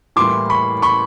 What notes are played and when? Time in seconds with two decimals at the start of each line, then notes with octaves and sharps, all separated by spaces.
0.16 A2 E3 G3 A#3 C6 D6
0.50 B5 C#6
0.82 B5 C#6